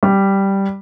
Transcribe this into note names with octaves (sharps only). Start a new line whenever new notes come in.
G3